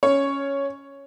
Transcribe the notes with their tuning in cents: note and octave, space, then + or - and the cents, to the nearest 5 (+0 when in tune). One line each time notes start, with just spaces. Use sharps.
C#4 +0 C#5 +0